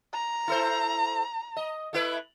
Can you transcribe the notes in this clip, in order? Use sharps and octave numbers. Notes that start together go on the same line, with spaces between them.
A#5
E4 A4 C5
D#5
A3 E4 B4